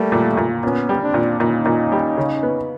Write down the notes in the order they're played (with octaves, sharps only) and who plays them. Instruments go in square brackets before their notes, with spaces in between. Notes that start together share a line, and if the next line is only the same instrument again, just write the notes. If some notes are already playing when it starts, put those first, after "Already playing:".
Already playing: [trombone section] G3 A3 [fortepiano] A#3
[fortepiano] A#2
A#2
[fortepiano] A#2 [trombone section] B3 C#4
[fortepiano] G3
[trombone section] C4 D4
[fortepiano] A#2
[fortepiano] A#2 [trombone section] C#4 D#4
[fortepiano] A#2
G3
C#3
B3